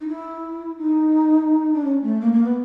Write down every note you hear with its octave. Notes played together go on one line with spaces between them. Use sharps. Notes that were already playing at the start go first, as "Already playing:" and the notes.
D#4
E4
D#4
D4
C#4
A3
A#3
A#3
B3